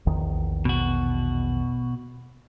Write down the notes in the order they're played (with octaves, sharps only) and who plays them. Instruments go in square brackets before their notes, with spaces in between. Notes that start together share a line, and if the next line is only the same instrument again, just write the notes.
[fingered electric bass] A#1 E2 D#3
[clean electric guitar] B2 F#4